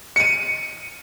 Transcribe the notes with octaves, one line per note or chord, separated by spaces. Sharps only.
C#7 D#7